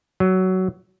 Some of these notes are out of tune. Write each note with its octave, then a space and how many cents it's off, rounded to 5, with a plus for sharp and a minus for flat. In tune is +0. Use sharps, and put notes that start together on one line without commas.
F#3 +15